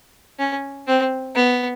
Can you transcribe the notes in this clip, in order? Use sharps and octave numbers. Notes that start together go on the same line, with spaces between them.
C#4
C4
B3